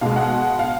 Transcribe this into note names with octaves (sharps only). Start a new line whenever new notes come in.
B2 G#3 F5
F#5
F5